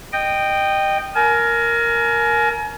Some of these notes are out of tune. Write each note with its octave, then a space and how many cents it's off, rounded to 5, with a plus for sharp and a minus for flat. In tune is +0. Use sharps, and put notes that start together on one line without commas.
D#5 -20 G5 +0
A#4 +0 G#5 +35